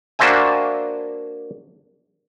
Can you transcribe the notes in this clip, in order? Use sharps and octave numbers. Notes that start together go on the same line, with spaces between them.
A#3 D4 F#4 C5 E5 G#5